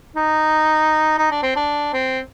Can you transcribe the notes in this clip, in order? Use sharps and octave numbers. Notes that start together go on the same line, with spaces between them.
D#4
D#4
D4
C4
D4
C4